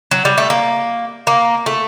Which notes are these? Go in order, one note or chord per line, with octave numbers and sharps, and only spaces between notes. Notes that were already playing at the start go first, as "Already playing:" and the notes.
F#3
G3
A3
A#3
A#3
A3